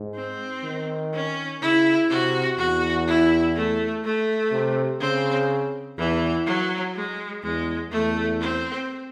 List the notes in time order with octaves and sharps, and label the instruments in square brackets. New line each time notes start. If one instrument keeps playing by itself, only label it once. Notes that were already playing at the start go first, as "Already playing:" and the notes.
Already playing: [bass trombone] G#2
[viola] C4
[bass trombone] D#3
[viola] C#4
[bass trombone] C#3 [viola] E4
[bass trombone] C3 [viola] F#4
[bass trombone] E2 [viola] F#4
[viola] E4
A3
A3
[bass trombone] C3
[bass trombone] C#3 [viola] C4
[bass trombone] E2 [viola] E3
[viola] F#3
G#3
[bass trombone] E2 [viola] G#3
[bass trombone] E2 [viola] A3
[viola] C4